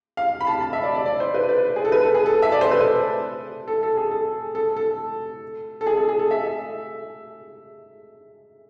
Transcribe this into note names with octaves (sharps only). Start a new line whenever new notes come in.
F5
B5
A5
A5
E5
D5
D5
D5
C5
B4
B4
G#4
A4
B4
A4
G#4
A4
E5
D5
C5
B4
A4
A4
A4
G#4
A4
A4
A4
A4
G#4
A4
G#4
A4
E5